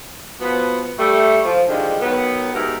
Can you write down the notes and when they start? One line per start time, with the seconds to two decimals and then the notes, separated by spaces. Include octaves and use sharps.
0.41 B2 F3 B3
0.99 G3 A3
1.45 F3
1.67 D3 D#3 F3 G3 G#3
2.00 D#3 F#3 B3
2.54 G#2 B2 G4 A#4 E5